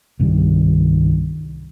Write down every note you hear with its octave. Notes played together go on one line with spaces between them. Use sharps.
C2 G2 D#3 G3